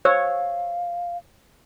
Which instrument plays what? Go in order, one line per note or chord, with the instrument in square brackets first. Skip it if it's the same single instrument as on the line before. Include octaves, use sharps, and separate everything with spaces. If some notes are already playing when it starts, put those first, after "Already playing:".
[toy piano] C5 E6 [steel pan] C#5 [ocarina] F5